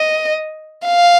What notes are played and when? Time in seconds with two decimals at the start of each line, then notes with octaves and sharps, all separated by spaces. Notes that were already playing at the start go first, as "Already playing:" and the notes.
Already playing: D#5
0.87 F5